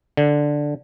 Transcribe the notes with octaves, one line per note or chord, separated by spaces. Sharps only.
D3